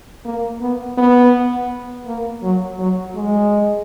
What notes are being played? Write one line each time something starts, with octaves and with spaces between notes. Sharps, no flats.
A#3
B3
B3
A#3
F#3
F#3
G#3